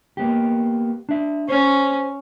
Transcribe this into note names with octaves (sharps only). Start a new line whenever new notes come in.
A#3 B3 G4
D4 E5
C#4 C5